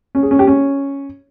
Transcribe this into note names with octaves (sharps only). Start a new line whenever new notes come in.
C#4
G#4
C#4
G4
C#4